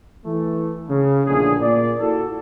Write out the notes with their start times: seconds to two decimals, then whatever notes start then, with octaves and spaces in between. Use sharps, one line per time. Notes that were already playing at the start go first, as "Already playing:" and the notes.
0.24 E3 A3
0.89 C#3
1.27 A#1 A2 D3 G#4
1.61 A#2 A#3 D5
2.00 E4 F#4 A4